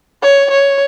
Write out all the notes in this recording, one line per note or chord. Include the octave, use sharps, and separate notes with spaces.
C#5
C#5